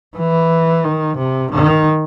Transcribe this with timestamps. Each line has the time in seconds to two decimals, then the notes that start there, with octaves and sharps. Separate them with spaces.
0.17 E3
0.84 D#3
1.17 C3
1.51 D#3